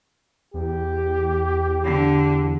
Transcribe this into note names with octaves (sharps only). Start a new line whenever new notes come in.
E2 G4
D3